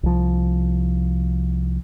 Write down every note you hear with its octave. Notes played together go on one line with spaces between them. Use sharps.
C2 F3